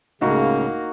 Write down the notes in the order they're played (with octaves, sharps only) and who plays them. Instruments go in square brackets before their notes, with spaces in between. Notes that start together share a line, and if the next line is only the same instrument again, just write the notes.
[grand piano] C#2 A2 A3 [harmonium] C#3 [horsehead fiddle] A#3 [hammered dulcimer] D#4 F#4